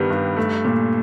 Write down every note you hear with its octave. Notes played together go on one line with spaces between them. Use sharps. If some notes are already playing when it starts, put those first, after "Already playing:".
Already playing: G2 D#3 G3 B3
G2
A3
A#2